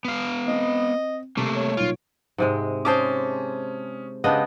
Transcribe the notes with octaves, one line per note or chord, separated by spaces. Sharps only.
B3 F5
C4 D#5
C3 A3 A#3
C#5
B1 A#2 F4 D7
G#2 C3 G#3
C#4 C5 A5 D6 D#6
C#3 G#3 B3 D4 G4 D#5